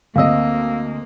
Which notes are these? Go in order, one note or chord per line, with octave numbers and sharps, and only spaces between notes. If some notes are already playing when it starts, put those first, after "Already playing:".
D2 A#3 C4 D#5 F5 E6